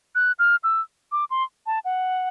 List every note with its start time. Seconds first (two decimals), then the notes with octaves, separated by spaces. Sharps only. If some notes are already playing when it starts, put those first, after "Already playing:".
0.15 F#6
0.39 F6
0.64 E6
1.12 D6
1.31 C6
1.66 A5
1.85 F#5